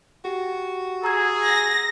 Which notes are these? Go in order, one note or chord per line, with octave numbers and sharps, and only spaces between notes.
F#4 G4
G#4 A#5 E6 G#6
A#6